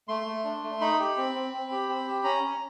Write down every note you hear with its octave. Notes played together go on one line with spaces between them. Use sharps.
A3 C6
A3
D4
A3
D#4 B5
G4
C4
C4
C4
G4
C4
G4
C#4 A#5
C#4